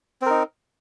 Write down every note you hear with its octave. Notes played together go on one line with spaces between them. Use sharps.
C4 D#4 A#4